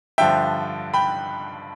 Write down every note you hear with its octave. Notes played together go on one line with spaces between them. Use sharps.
G2 D3 F3 E5 G5
G5 B5